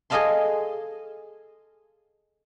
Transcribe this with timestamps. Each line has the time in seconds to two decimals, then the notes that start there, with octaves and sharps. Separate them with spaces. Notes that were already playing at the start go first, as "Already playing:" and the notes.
0.10 G#4 A4 D#5 F5 A5 C6